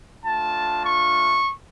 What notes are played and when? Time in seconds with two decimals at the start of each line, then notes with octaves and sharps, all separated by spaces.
0.23 A3 D4 F4 A5
0.85 C#6